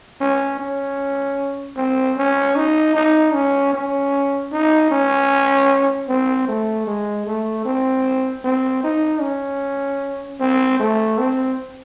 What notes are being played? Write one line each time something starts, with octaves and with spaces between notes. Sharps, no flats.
C#4
C#4
C4
C#4
D#4
D#4
C#4
C#4
D#4
C#4
C4
A3
G#3
A3
C4
C4
D#4
C#4
C4
A3
C4